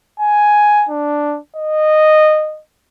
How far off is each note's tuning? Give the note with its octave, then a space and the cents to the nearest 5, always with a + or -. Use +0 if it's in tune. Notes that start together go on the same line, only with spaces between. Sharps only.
G#5 +5
D4 +0
D#5 -15